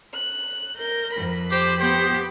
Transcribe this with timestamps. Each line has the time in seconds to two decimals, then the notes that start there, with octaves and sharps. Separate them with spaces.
0.13 F#6
0.77 A#4 G6
1.14 F2 B5
1.51 G4 C5
1.80 B3 G4 C5